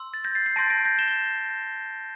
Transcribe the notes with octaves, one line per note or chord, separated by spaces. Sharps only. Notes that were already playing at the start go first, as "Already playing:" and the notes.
Already playing: C6 E6
A6
G6 A#6
A6 C7
A6 C7
A5 C6 G6 A#6 D7
A#6 D7
G6 A#6
E7 G7